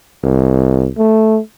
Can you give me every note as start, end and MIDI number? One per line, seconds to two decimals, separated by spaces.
0.24 0.88 36
0.98 1.39 57